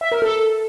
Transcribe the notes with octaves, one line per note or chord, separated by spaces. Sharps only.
E5
A#4
A4